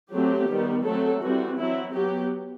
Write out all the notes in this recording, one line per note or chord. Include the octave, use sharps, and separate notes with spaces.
F#3 A3 C4 G4
D#3 G3 B3
F#3 A3 C4 A4
E3 G3 C4 F#4
F#3 C4 E4
F#3 B3 G4